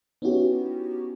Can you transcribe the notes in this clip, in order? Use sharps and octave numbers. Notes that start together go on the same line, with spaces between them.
B3 C#4 D#4 E4 F#4 G4